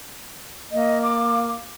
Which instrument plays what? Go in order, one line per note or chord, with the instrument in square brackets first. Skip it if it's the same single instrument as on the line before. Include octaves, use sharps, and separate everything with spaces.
[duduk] A#3 [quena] D#5
[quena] D6